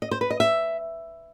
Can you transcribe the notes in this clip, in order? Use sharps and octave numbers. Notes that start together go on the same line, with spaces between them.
D#5
C5
B4
D#5
E5